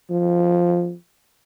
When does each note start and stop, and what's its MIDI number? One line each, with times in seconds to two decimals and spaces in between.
0.10 0.94 53